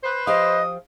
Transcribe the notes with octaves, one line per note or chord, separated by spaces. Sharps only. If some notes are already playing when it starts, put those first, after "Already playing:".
B4 C5
F3 G4 D#5 F5 D#6